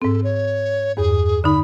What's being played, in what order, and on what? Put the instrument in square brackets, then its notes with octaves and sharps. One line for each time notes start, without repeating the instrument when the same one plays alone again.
[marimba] G#2 C4 [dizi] A4
[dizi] C#5
[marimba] E2 G2 [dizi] G#4
[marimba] D3 D#4 [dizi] B5